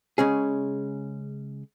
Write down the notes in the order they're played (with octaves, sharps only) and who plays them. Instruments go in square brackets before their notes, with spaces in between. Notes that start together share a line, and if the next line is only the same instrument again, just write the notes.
[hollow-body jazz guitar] C#3 G#3 C#4 G#4